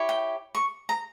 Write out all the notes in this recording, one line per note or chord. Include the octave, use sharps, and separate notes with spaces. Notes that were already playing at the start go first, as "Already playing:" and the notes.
Already playing: E4 G4 C#5
G5
C#6
A#5